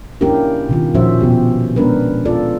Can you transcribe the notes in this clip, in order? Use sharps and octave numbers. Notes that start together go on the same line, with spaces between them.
A#3 C#4 D4 E4 G4 A#4
B2 D#3 F4
A#2 F3 C#4 F#4 C5 E5
B2 B3 G4
G#3 B3 C#4 D4 A#4 B4
F4 A4 D5